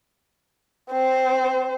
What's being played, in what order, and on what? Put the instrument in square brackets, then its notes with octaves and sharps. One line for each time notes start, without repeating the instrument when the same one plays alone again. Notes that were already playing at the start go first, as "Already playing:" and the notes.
[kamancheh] C4 C5